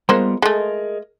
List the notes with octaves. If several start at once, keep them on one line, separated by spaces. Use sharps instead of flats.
G3 G#3 A#3 B3 F4 C5
G#3 A3 G#4 A#4 D#5